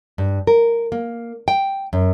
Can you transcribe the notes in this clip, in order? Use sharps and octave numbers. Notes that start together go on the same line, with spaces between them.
G2
A#4
A#3
G5
F#2